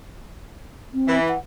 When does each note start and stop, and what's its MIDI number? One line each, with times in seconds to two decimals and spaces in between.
0.94 1.19 60
1.07 1.31 52
1.28 1.38 78